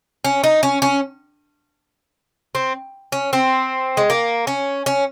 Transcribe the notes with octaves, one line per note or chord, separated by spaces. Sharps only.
C#4
D#4
C#4
C#4
C4
C#4
C4
G#3
A#3
C#4
C#4